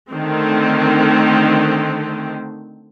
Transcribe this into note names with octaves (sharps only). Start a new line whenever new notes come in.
D3 D#3 A3 C4